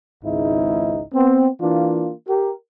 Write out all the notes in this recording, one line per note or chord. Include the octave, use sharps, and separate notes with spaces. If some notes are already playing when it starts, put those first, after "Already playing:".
G#1 C#2 G#2 D#4 E4
B3 C4
E3 A#3 D4 F4
G4 A#4